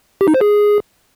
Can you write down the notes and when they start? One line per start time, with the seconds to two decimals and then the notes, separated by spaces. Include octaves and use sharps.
0.21 G4
0.28 D#4
0.34 C5
0.41 G#4